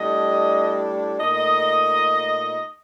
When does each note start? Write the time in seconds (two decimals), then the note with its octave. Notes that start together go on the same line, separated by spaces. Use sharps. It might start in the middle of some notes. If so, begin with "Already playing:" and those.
Already playing: A2 G3 D4 D#5
1.19 A#2 A3 D#4 D#5